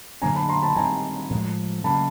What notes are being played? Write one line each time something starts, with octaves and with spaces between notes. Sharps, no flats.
D3 F#3 A#3 D4 G#5 A#5
A5 B5
A#5 C6
A5 B5
D#3 G3 C4 G#5 A#5
A2 F3 G#3
C#3 F#3 A#3 A5 B5